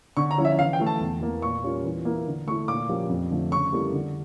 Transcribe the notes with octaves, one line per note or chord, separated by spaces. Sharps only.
D3 C#6
A#5
F3 C#4 E4
E5
E3 F5
G5
A3 E4
A5
E2
E3 A#3
A#2 C#6
G3 C#4 F4 A#4
E3
A#3 E4
D3
A3 E4 C#6
A#2 D6
F3 C#4 G4 A#4
F2
D3 F3 A3 D4
C#3 C#6
G3 A#3 E4 A4
D3